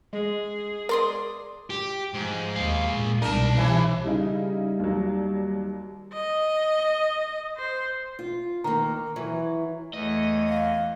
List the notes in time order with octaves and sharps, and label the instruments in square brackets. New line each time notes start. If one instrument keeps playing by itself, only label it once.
[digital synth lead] G#3 [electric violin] G#4
[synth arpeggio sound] A#4 [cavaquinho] D5 C6 D#6
[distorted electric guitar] G4
[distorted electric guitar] G#2 [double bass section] F3
[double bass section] D#2 [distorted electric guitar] G#3 F5
[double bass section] A#2
[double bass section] C2 B2 [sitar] D4 A#4 [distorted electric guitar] D#4 A5
[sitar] C3 E3
[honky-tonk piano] C#3 D#4 E4 [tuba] G3
[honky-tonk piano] D#2 F#3
[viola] D#5
C5
[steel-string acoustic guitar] F4
[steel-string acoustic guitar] D#3 A#3 [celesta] A#5
[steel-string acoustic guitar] E3 F#3
[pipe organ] E2 [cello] A3 C#5 [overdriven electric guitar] D#5
[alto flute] F5